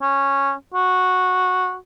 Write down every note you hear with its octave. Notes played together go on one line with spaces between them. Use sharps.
C#4
F#4